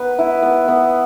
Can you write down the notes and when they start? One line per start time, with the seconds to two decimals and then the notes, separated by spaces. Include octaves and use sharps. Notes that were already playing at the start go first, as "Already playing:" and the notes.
Already playing: B3 B4
0.19 E4
0.42 B3
0.68 B3